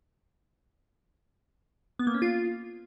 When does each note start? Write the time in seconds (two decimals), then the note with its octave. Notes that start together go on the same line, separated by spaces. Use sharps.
1.99 B3
2.07 A#3
2.14 C#4
2.22 F4